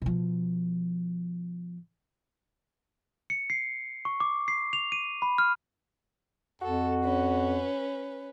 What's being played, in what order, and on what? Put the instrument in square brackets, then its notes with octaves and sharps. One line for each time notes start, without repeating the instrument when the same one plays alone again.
[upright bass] B2 F3
[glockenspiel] C#7
C7
C#6
D6
C7
F7
D#7
B5
F6
[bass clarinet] F2 [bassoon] F#4 [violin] A4
[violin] C#4 B4